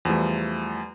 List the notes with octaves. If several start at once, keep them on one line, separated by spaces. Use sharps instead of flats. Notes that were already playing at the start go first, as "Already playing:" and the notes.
E2 F3 G3 A3